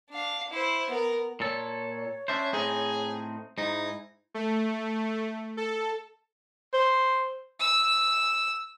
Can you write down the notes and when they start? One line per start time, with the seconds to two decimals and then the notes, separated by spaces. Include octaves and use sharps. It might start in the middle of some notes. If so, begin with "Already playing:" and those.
0.11 D4 F5
0.50 E4 C5
0.90 B3 A#4
1.40 A#2 A4 C#5
2.28 C#4 D4 C5 E5
2.53 A2 C4 D#4 G#4
3.58 G#2 D#4 E4
4.34 A3
5.57 A4
6.73 C5
7.60 E6